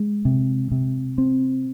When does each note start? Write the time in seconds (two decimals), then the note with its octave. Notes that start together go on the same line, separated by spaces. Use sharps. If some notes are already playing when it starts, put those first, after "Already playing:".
Already playing: G#3
0.25 C3
0.72 C3
1.18 C4